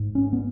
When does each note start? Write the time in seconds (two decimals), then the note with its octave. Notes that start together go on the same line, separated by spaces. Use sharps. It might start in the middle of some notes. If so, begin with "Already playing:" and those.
Already playing: G#2
0.15 C#4
0.32 B3